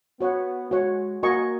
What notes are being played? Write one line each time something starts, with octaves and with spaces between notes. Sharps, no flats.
B3 F#4 C#5 F#5
G#3 F#4 C#5 F#5
A#3 F#4 A#4 D#5 G#5 C#6